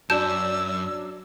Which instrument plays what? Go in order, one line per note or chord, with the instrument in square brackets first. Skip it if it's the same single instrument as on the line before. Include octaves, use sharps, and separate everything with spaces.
[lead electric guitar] F#2 [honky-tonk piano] F#3 D4 [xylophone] A5 G6 E7 [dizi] E6